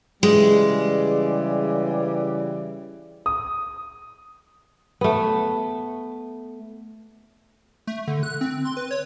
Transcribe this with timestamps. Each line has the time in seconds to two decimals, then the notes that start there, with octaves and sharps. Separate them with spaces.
0.23 C#3 E3 G3 G#3
3.26 D#6
5.01 A3 B3
7.87 A3
8.07 D3
8.23 F#6
8.41 C4
8.65 C6
8.77 B4
8.91 C#5